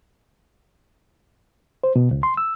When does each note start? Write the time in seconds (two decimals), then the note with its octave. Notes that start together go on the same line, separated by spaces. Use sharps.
1.84 C5
1.96 B2
2.11 C#2
2.23 C6
2.37 E6